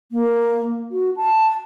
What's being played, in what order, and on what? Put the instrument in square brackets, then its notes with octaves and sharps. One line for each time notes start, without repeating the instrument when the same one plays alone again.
[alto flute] A#3
F#4
A5